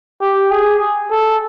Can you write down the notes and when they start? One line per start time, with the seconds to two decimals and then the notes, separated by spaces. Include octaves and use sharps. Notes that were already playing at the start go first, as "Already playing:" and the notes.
0.21 G4
0.51 G#4
1.11 A4